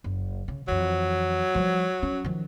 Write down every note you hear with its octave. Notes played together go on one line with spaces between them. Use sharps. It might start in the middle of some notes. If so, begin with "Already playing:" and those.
F#1
C#3
F2 E3 F#3
F3 G3
C#4
D#3 F3